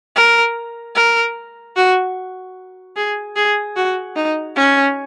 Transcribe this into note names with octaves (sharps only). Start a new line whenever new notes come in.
A#4
A#4
F#4
G#4
G#4
F#4
D#4
C#4